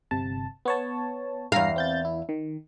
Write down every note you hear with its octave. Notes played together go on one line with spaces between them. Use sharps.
G1 C3 A5
B3 C#5 A5
E2 G2 F5 A#5 C7
C4 G6 A6
E4
D#3